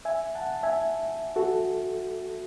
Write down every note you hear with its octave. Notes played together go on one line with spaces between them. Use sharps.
E5 G#5
F#5 A5
E5 G#5
F#4 A4